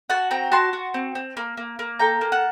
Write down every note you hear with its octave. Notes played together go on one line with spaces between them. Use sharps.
F#4 F#5 A5
C4 G5 A#5
F#4 A5 C6
F#4
C4
C4
A#3
A#3
A#3
A4 G5 A#5
A#3
F#5 A5